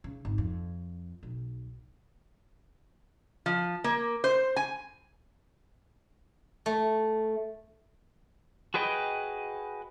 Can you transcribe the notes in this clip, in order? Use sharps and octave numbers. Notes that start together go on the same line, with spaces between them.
C#3
G#1
F2
B1
F3
A#3
C5
G#5
A3
F#4 G#4 B4 D#5 G5